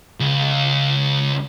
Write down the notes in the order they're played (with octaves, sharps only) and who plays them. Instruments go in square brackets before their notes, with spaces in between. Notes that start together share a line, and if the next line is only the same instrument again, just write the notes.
[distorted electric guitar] C#2